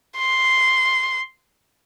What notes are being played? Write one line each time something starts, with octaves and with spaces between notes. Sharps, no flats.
C6